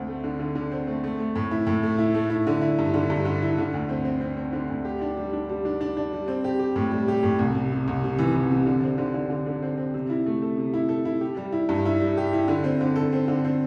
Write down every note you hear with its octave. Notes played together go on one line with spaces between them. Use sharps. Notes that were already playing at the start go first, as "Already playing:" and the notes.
Already playing: D2 C4
A3
D3
D3
D3
C4
A3
A3
A3
A2
E4
A2
A3
E4
A3
E4
D3
E4
G2
D3
G2
D3
E4
D3
D2
C4
C4
C4
C4
D3
D2
G4
D4
G3
D4
G3
D4
D4
D4
G3
C4
G4
G4
A2
G3
G4
A2
C2
C3
C3
C2
C3
E3
E3
C3
D3
C4
D3
D3
D3
D3
C4
C4
C3
E4
A3
A4
C3
E4
A4
E4
G4
G3
E4
G2
E4
G3
G4
E4
D3
C4
D3
A4
C4
D3
C4